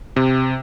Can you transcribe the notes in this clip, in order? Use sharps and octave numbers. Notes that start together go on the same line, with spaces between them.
C3